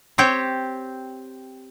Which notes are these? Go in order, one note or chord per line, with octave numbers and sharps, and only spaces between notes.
C4 G4 C#5 G5